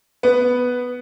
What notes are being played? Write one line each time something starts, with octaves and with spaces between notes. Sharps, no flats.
B3